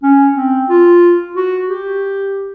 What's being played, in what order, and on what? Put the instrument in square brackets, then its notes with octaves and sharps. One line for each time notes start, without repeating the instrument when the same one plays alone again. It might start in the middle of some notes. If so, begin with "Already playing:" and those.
[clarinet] C#4
C4
F4
F#4
G4